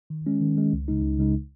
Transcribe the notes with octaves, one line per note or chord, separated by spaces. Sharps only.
D#3
G#3 C#4
D#3
G#3 C#4
C#2
C#3 G#3 D#4
C#2
C#3 G#3 D#4